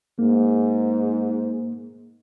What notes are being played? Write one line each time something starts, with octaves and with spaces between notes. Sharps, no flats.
G#2 A#3